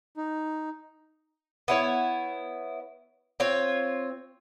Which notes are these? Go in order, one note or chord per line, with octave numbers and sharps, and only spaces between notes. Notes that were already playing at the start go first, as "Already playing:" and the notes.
D#4
B3 E4 C#5
C4 F4 C#5